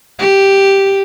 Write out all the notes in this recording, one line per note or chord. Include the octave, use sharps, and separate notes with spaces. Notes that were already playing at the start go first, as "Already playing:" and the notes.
G4